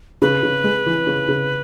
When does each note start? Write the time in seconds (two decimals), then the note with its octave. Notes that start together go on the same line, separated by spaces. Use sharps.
0.22 C#3 B4
0.43 C#3
0.64 G#3
0.86 E3
1.07 C#3
1.28 C#3